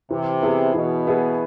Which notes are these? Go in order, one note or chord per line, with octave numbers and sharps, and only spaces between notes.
C3 E3
B3 E4 G#4
B2 E3
B3 E4 G#4